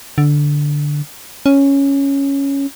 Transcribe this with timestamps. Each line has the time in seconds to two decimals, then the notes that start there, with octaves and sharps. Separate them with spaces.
0.18 D3
1.46 C#4